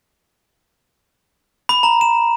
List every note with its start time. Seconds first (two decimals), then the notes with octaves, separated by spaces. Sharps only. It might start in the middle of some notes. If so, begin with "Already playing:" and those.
1.69 B5
1.83 A#5
2.01 E7